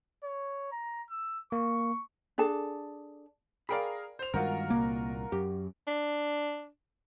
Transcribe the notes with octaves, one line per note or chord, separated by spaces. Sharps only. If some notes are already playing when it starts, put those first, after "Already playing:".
C#5
A#5
E6
A#3 C#6
D4 G#4 A4 A5
G#4 A#4 D5 F5 G5 B5
C5 F7
G2 D#3 G#3 F4 F#4 A#4
C2 A#2 A#3
F#2 G4
D4